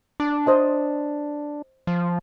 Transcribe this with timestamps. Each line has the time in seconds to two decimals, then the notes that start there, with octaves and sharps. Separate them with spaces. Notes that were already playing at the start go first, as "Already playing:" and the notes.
0.20 D4 D6
0.46 C5 D#5 A5
1.87 F3